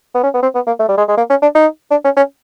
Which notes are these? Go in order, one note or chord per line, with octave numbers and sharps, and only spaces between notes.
B3
C#4
B3
C4
B3
A#3
A3
G3
G#3
G#3
A#3
C#4
D4
D#4
D4
C#4
C#4